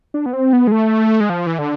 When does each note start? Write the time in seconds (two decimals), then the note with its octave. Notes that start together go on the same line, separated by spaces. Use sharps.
0.14 D4
0.26 B3
0.33 C4
0.53 B3
0.67 G#3
0.72 A3
1.20 G#3
1.30 F3
1.47 E3
1.59 D3